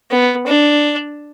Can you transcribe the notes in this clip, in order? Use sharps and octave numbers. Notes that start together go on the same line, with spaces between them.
B3
D4